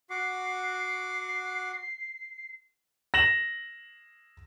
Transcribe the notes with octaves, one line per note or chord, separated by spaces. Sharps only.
F#4 F#5 D6 C7
A#6 E7 F#7